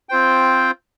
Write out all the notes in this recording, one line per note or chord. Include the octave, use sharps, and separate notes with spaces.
C4 F4 C5 G5